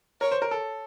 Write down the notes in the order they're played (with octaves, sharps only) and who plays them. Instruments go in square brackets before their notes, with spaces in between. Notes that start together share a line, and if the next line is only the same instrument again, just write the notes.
[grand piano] A#4 [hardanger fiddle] C#5
[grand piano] C5
A#4
A4